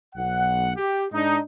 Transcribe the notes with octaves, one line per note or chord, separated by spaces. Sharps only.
B1 F#5
G4
G#2 D4 D#4